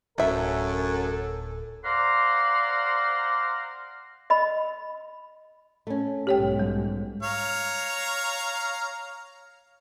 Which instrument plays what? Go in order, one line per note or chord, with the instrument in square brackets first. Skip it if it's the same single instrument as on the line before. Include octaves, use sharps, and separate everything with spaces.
[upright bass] D1 [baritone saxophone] F#2 [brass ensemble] A4 [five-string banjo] A#4 E5
[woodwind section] C5 D5 F5 F#5 A#5 C6
[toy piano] D#5 B5
[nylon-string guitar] A3 C#4
[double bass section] B1 G#2 G#3 [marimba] G4 C#5 G5
[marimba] G3
[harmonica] C#5 F5 A#5